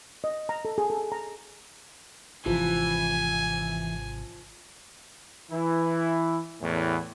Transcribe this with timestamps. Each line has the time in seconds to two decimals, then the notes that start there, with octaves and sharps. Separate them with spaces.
0.24 D#5
0.49 A#5
0.65 A4
0.78 G#4
0.90 A4
1.12 A#5
2.46 G#1 C3 E3 F3 G#5
5.50 E3 E4
6.61 E2 A2